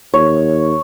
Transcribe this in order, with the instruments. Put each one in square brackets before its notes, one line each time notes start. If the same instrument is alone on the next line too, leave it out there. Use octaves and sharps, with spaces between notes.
[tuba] D#2 [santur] C#5